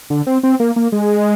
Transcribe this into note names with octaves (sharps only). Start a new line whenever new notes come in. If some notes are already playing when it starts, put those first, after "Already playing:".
D3
C4
C4
A#3
A#3
G#3